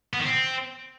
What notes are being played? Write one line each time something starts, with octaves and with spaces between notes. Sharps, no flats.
B3
D#3
C4